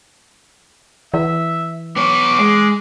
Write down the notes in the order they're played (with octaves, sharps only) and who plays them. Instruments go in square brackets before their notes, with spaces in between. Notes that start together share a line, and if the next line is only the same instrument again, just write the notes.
[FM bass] E3 [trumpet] E5
[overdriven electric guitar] B3 C#5 [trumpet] D6
[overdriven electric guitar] G#3